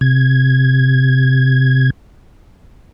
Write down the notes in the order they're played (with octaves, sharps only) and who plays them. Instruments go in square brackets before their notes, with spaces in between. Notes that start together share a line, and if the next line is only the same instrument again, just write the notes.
[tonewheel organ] C3 G#6